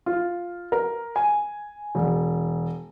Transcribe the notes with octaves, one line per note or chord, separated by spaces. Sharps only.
F4
A#4
G#5
E1